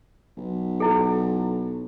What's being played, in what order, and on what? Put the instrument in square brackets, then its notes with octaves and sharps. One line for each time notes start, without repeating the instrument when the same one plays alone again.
[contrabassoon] B1
[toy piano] E4 A4